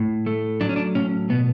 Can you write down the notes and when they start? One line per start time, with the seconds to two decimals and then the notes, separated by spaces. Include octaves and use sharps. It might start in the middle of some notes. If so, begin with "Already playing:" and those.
Already playing: A2
0.26 A3
0.61 F#3 D4
0.69 C#4
0.76 D4
0.95 A2 C#4
1.30 B2 B3